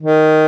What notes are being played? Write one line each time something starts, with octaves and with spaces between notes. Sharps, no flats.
D#3